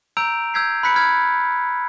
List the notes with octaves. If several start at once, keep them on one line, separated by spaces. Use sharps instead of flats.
A#5 E6 G6 D7 F7
E6 G6 G#6 B6 C7
B5 F#6 B6 C#7
F6 G#6 B6